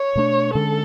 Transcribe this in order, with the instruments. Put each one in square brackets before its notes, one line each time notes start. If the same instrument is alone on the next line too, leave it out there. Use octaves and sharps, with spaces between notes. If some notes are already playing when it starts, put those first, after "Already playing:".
Already playing: [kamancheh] C#5
[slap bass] B2 A3 D4
[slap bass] D3 G#3 C#4 [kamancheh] A4